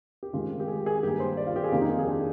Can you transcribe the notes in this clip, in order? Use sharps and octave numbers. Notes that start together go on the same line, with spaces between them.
G4
G#2 D#3 G#3 C4 F4
G4
G#4
G#4
G2 D#3 A#3 G4
C5
D5
F4
G4
G#4
F2 C3 D#3 A#3 F4
D#4
G4
G#4
D4